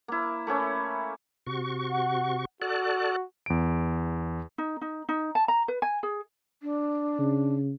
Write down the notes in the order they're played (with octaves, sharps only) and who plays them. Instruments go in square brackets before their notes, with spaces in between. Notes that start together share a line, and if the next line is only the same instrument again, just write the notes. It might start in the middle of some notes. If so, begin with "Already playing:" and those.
[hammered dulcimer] A#3 E4
A3 A#3 C#4 E4
[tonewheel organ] C3 F#4 C#6
[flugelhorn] F#5
[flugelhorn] F#4 [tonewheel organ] A4 D5 F#6
[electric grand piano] E2 D7
[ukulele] D#4
D#4
D#4
A5
A#5
B4
G#5
G#4
[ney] D4
[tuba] C#3